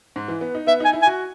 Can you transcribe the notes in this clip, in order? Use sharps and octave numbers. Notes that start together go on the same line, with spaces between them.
G#2
E3
B3
D#4
B3 E5
D#4 G#5
E4
G#5
F#4